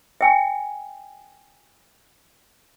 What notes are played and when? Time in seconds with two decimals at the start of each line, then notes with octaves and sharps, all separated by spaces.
0.21 E5 G5 G#5